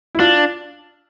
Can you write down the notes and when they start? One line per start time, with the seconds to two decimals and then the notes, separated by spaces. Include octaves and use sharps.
0.15 E4
0.20 D4 F4